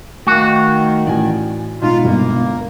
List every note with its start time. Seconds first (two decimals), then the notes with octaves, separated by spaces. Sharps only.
0.27 D#3 A3 F#4 F5
1.07 A1 D5 G#5
1.82 B2 G#3 B3 D#4 F4
2.04 G1 A#3